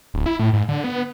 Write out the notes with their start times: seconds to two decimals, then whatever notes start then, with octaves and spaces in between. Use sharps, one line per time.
0.14 D1
0.26 E4
0.39 A2
0.53 G#2
0.69 D3
0.84 B3